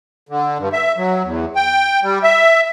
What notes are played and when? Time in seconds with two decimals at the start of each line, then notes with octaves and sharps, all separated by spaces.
0.29 D3
0.59 G2
0.73 E5
0.97 F#3
1.23 E2
1.56 G5
2.03 G3
2.23 E5